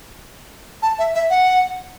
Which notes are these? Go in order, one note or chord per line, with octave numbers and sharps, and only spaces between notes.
A5
E5
E5
F#5